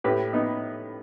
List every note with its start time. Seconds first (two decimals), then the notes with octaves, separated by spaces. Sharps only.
0.04 A2 G4 B4
0.33 B3 D#4